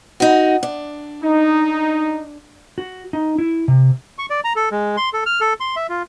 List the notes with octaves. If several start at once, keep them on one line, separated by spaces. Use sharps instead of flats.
D#4 F#4
D4
D#4
F#4
D#4
E4
C3
C#6
D5
A#5
A4
G#3
C6
A4
F6
A4
C6
E5
F4